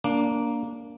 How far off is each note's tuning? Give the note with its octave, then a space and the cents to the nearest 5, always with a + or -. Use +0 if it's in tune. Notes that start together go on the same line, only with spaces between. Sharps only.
A#3 +0 D4 -15